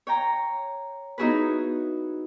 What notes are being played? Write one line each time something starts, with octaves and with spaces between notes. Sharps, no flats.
C#5 G5 A#5
B3 D#4 E4 F#4 G#4 B4